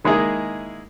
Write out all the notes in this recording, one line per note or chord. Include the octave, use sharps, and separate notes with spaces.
D#3 G#3 A#3 E4 G#4